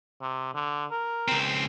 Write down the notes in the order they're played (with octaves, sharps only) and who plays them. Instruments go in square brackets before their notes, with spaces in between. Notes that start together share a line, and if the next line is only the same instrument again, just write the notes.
[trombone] C3
D3
A#4
[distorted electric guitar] C#2 C4